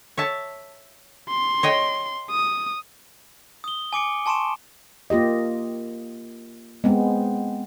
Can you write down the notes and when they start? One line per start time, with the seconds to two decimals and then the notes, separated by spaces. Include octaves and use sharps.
0.17 C#5 E5 A5
1.30 C6
1.63 C#5 D#5 G5
2.31 D#6
3.64 D#6 G7
3.93 G#5 D6 C#7 D7
4.26 G#5 A5 C6 C#6 D7 E7
5.10 A#3 F4 G4 D#5
6.84 G#3 B3 C4